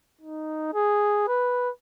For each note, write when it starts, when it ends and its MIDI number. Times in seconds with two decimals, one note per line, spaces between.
0.21 0.74 63
0.74 1.24 68
1.28 1.70 71